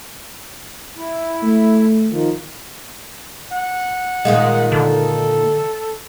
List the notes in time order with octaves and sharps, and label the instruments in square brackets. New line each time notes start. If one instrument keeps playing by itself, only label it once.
[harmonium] E4
[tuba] A3
[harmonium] D#3 F3
[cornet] F#5
[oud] A#2 D#3 G#3 [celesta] D#5 F5
[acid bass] D3 [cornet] A4